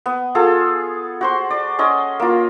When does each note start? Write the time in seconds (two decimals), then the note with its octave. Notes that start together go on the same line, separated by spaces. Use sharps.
0.06 B3
0.35 F4 G#4 A4
1.21 F#4 C5 C6
1.50 D5
1.79 C#4 D#5 C6
2.20 A#3 F4